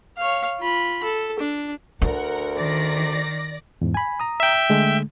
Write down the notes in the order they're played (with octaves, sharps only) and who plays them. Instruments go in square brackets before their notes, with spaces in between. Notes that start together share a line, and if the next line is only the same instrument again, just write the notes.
[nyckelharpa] C#5 F5
F4 B5
A4
D4
[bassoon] D2 [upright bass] D4 [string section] A#4 F#5
[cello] D#3 [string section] D5 A#6
[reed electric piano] E2 G#2
G#5 B5
A#5 D#6
[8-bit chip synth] E5 G5
[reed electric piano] D3 G#3 A3